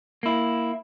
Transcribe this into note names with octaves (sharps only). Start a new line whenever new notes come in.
A#3 E4